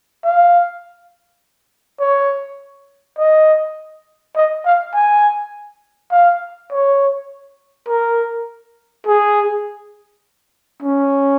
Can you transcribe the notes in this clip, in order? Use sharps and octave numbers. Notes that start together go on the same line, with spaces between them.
F5
C#5
D#5
D#5
F5
G#5
F5
C#5
A#4
G#4
C#4